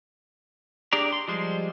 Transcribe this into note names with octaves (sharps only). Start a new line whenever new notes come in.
D4 G4 G#4 D5 A#5
C6
F3 G3 G#3 C5